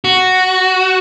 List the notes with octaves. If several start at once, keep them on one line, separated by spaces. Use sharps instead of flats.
F#4